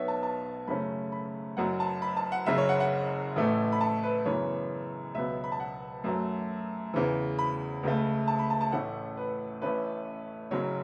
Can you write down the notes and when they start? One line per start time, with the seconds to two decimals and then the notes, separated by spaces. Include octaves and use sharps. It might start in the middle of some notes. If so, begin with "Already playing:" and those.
Already playing: B1 B2 B3 C#5 E5
0.08 A5
0.23 A5
0.67 F#2 C#3 A3 C#4 B5
1.12 B5
1.57 F#1 F#2 F#3 F#5
1.80 A5
2.02 B5
2.17 A5
2.32 F#5
2.46 F#1 F#2 C#3 E5
2.58 C#5
2.69 F#5
2.80 F#5
3.36 A1 A2 E3 A3
3.72 B5
3.81 A5
4.03 B4
4.25 F#2 C#3 E3 B3 C#5
5.14 C#2 B2 F#3 B3 E5
5.44 B5
5.52 A5
5.60 F#5
6.04 F#2 F#3 A3
6.94 E2 C#3 E3
7.39 B5
7.83 C#2 C#3 A3
8.27 A5
8.39 B5
8.50 A5
8.61 A5
8.72 A1 A2 A3 C#4 F#5
9.17 B4
9.62 A1 A2 A3 C#4 B4
10.51 F#1 F#2 C#3 F#3 C#5